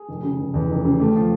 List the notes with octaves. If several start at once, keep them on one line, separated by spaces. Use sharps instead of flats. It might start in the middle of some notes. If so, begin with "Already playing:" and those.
Already playing: G#4
F1
C#3
F1
E2
F1
C#3
A3 G4
F3